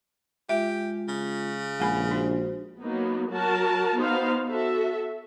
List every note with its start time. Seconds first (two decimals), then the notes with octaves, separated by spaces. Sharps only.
0.49 G#3 F4 G4 E5
1.08 C#3
1.80 A#1 G#3 G#5 B5
2.11 D4 F#4 C5
2.82 F#3 A#3 B3 D#4
3.29 F#3 F#4 A#4 A5
3.99 B3 D#4 F#4 C5 F5
4.49 F#4 A4 E5